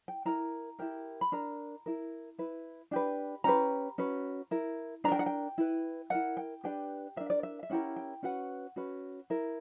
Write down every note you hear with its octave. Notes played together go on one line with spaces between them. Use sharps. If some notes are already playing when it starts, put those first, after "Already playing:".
G5
E4 A#4 A#5
E4 G4 A#4
B5
D4 A#4 A#5
E4 A#4
E4 B4
D4 G4 B4
C#4 G4 B4 A#5
C#4 F#4 B4
E4 A#4
D4 A#4 G5 A#5
F#5
G5
E4 B4
E4 A#4 F#5
G5
D4 G4 B4 G5
D4 A#4 E5
D5
E5
E5
C#4 E4 G4 A#4 F#5
G5
C#4 F#4 B4 F#5
C#4 F#4 B4
E4 A#4